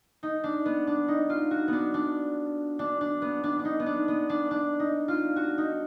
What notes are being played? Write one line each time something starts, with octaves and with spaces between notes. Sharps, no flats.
D#4
D4
B3
D4
D#4
F4
F#4
B3 D4
D4
D4
D4
B3
D4
D4
D#4
B3
D4
B3
D4
D4
D#4
F4
F#4
D#4